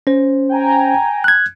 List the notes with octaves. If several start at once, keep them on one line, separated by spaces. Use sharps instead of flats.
C#4 C5
G5 G#5 A#5
F#6 G#6